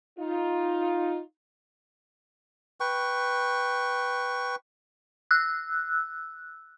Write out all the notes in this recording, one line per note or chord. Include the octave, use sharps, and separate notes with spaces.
D#4 F4
B4 G5 C#6
E6 F#6